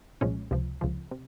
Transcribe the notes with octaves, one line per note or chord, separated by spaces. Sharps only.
C2 A#2 F3 G#3 C#4
C#2 C3 F3
C#2 C3 F3
C3